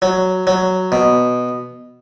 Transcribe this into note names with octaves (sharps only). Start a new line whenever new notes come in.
F#3
F#3
B2